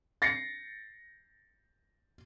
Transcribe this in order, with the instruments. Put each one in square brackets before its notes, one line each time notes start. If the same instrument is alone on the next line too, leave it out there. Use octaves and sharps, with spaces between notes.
[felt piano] A6 A#6 C7 C#7